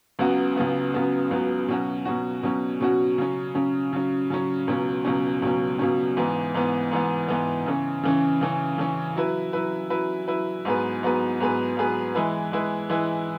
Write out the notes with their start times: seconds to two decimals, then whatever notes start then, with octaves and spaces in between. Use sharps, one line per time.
0.19 C#2 C#3 F#3 B3 F#4
0.56 C#2 C#3 F#3 B3 F#4
0.94 C#2 C#3 F#3 B3 F#4
1.31 C#2 C#3 F#3 B3 F#4
1.68 B2 F#3 C#4 F#4
2.05 B2 F#3 C#4 F#4
2.43 B2 F#3 C#4 F#4
2.81 B2 F#3 C#4 F#4
3.18 C#3 F#3 C#4
3.55 C#3 F#3 C#4
3.93 C#3 F#3 C#4
4.30 C#3 F#3 C#4
4.67 C#2 B2 F#3 C#4
5.05 C#2 B2 F#3 C#4
5.42 C#2 B2 F#3 C#4
5.79 C#2 B2 F#3 C#4
6.17 G#2 E3 B3
6.54 G#2 E3 B3
6.91 G#2 E3 B3
7.29 G#2 E3 B3
7.66 C#3 E3 C#4
8.03 C#3 E3 C#4
8.41 C#3 E3 C#4
8.78 C#3 E3 C#4
9.16 F#3 E4 B4
9.53 F#3 E4 B4
9.90 F#3 E4 B4
10.28 F#3 E4 B4
10.65 G#2 F#3 B3 G#4 B4
11.03 G#2 F#3 B3 G#4 B4
11.40 G#2 F#3 B3 G#4 B4
11.77 G#2 F#3 B3 G#4 B4
12.15 E3 G#3 E4 B4
12.52 E3 G#3 E4 B4
12.90 E3 G#3 E4 B4